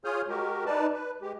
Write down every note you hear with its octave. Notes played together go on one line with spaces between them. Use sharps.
F4 G#4 C#5 D#6 F6 G6
G#3 F#4 G4 A#4
D#4 B4 D5 A5
B4
G#3 G4